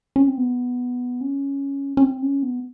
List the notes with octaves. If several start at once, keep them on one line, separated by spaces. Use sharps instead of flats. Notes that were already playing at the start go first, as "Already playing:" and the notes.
C#4
C4
B3
C#4
C#4
C4
C#4
B3